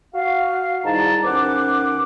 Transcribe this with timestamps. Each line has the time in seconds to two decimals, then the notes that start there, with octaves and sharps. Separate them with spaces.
0.15 F#4 F5
0.85 G#2 D#3 G3 E4 A5 A#5
1.24 D#2 B3 C#4 C5 F#5 D6